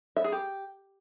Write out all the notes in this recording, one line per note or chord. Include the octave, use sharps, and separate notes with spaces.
E5
G#4
G4